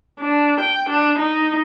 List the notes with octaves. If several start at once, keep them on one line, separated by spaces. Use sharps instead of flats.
D4
G5
D4
D#4